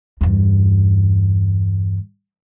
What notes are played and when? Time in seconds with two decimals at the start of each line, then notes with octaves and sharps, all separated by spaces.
0.21 E2 G2